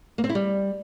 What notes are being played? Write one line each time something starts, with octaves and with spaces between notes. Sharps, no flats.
A#3
C4
E4
G3